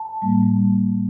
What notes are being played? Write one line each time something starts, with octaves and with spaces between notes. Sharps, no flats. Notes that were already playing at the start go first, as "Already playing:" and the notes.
Already playing: A5
A2 G3 A#3